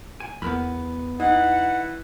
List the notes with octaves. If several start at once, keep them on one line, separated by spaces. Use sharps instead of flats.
G#5
E2 B3 A#4 B5
E3 D#4 F#5